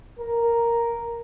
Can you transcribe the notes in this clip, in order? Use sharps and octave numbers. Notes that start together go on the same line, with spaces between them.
A#4